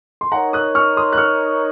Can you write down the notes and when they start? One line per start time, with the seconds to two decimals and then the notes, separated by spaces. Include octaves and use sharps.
0.21 C6
0.32 D#4 A#4 C#5 F#5 A#5
0.53 D#6 F#6
0.75 C#6 F6
0.97 C6 D#6
1.13 F#6
1.18 C#6 F6